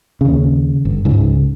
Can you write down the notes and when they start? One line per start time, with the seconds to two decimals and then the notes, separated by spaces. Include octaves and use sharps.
0.21 D#2 C#3
0.85 G1
1.05 C#2 G#2